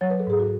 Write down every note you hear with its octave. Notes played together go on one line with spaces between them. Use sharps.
F#3 C#5
B4
A4
G#2 G#4
F#4